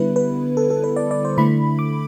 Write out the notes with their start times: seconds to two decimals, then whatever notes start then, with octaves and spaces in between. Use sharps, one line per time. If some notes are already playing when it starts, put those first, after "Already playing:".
Already playing: D3 G3 B3 E4 B4
0.16 B4
0.57 A4
0.70 A4
0.84 B4
0.96 D5
1.11 D5
1.25 C5
1.38 D3 A3 E4 B5
1.79 D6